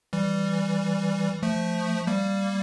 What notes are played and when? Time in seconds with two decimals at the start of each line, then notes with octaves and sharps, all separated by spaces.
0.13 E3 G3
1.42 F3 A3
2.07 G3 A#3